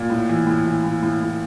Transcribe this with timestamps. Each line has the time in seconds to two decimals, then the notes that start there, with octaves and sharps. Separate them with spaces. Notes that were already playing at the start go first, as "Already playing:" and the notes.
Already playing: A#2
0.10 A2
0.29 E3
0.47 A2
0.66 E3
0.84 A2
1.03 A2
1.21 A2